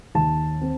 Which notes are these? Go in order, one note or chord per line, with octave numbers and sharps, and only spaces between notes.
D#2 A5
C4